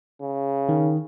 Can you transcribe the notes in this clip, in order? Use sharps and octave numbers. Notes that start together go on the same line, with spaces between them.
C#3
D#3